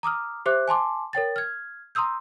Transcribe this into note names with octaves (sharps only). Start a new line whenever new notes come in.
A#5 D6 D#6 F6
G4 C5 E5 D6 F#6
G#5 A5 C6 D6
A#4 C#5 G5 A6
F6 G#6
A#5 C6 D#6 E6 G6